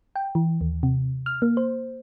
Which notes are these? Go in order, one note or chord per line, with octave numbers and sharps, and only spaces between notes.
G5
E3
D#2
C3
F6
A#3
C5